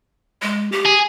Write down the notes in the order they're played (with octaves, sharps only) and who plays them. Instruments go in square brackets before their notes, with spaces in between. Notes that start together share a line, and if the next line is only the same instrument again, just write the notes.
[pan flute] G#3
G4
[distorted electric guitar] G#4